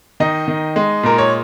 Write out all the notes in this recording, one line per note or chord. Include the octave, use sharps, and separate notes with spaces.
D#3 D#4 D#5
D#3
G#3
A#2 A#4
C#5